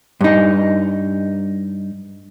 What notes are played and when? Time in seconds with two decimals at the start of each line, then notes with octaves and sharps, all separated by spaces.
0.21 G2 D#4